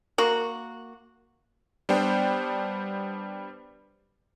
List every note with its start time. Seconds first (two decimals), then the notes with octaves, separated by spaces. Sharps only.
0.18 A#3 F#4
1.89 G3 B3 D4 C5 G5